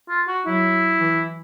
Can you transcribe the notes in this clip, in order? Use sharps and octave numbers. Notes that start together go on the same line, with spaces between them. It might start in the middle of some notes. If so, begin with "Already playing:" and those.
F4
F#4
F#3 E4
E3